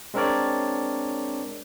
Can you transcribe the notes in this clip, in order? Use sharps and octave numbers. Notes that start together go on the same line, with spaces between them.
G#3 C4 D4 A#4 C#5 D5